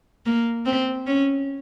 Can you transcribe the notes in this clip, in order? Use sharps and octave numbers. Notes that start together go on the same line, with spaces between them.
A#3
C4
C#4